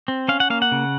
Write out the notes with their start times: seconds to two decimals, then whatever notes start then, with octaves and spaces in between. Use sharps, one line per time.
0.08 C4
0.28 C#4 F5
0.40 F#5
0.50 A#3 F5
0.62 F#5
0.72 C#3